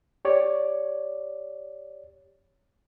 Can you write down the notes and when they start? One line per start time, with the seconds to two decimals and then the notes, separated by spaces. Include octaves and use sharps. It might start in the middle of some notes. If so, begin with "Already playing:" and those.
0.25 G4 C#5 D5